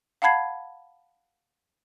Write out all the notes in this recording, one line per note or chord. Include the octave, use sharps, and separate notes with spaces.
F5 F#5 A5 B5 G#6 C7